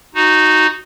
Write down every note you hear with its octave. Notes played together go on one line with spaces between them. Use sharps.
D#4 F#4